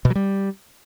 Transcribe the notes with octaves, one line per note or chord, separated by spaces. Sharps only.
B2
F#3
G3